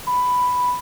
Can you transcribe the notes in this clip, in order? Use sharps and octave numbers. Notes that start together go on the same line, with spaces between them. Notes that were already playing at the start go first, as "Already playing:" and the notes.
B5